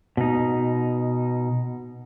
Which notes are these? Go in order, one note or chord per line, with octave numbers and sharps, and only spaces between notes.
B2 D#4